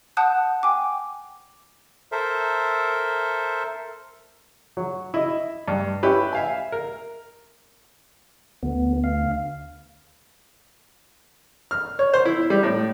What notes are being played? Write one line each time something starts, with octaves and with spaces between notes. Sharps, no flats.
F#5 A5 D#6 F#6 G6
G5 G#5 D6
A4 A#4 C5 E5
F#3
E4 D#5
G2
C#4 E4 G4 B4
E5 F5 G#5
A#4
D2 B3
F5
F6
C#5
C5
E4
G3
A2